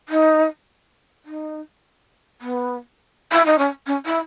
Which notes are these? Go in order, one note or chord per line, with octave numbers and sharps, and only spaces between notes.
D#4
D#4
B3
E4
D#4
C#4
C#4
E4